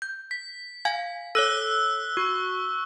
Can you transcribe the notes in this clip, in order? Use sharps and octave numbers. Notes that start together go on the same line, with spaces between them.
G6
B6
F5 G#5 G#6
A4 C#5 E6 F#6 G7
F#4 C#6